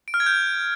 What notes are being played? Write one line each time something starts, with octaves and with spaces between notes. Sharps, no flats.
D7
F6
G#6
G6